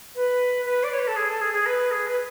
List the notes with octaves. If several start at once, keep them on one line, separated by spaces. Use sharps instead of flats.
B4
B4
D5
C#5
B4
A4
G#4
A4
G#4
G#4
B4
G#4
B4